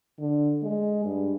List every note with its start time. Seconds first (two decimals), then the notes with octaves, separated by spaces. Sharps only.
0.19 D3
0.63 G#3
1.05 G2